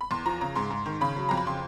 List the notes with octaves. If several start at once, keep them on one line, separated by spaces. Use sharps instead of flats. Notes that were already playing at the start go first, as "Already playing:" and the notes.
B5
E2 C6
F3 A#5
C#3 A#5
G#2 C6
G#2
D#3
C#3 B5
F#3
F2 A#5
B5
C#3 C6